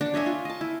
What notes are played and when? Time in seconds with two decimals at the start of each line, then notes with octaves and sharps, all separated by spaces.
0.01 D4 F#5
0.14 C#5 D#5 E5 G#5
0.26 F4
0.45 D#5 A5
0.61 E4